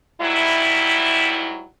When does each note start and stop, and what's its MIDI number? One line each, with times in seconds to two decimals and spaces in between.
0.21 1.65 44
0.21 1.65 54
0.21 1.65 55
0.21 1.65 64